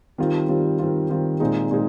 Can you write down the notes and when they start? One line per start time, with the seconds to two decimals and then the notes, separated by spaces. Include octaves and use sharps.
0.18 D#3 G3 C4 F4
0.49 D#3 G3 C4 F4
0.79 D#3 G3 C4 F4
1.09 D#3 G3 C4 F4
1.40 A#2 G#3 C4 D#4 G#4
1.71 A#2 G#3 C4 D#4 G#4